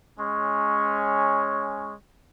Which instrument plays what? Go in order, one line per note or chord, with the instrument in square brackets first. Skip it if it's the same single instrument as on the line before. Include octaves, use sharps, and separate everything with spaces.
[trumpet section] G#3 C#4 C#5